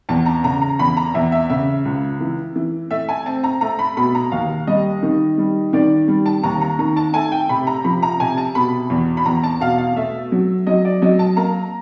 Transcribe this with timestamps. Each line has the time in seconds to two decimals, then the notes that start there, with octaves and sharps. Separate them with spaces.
0.09 E2 A5
0.26 A#5
0.44 C#3 A#5
0.62 A#5
0.79 E2 B5
0.97 A#5
1.14 E2 E5
1.32 E5
1.50 C#3 E5
1.85 C#2
2.20 E3
2.56 E3
2.90 A3 E5
3.09 G#5
3.26 C4 A5
3.44 A#5
3.61 A3 A#5
3.79 B5
3.97 B2 B5
4.15 A#5
4.32 D#2 F5
4.67 G3 D#5
5.03 D#3
5.38 G3
5.73 D#3 D5
6.08 G3
6.26 A5
6.44 D#2 A#5
6.61 A#5
6.79 D#3 A#5
6.97 A5
7.14 A3 G#5
7.32 G5
7.49 C3 B5
7.67 A#5
7.84 F3 B5
8.03 A#5
8.20 C3 G#5
8.37 A5
8.55 B2 B5
8.90 E2
9.17 B5
9.26 E2 A#5
9.43 A5
9.61 B2 F5
9.78 F5
9.96 A3 E5
10.32 F#3
10.67 F#3 D#5
10.85 D5
11.02 F#3 D#5
11.19 A5
11.37 A#3 A#5